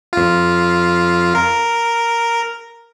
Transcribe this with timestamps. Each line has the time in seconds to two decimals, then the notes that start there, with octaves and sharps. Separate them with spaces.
0.13 F2 F4
1.35 A#4